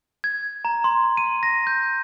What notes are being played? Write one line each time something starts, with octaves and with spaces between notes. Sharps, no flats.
G#6
A#5
C6
D#7
A#6
G6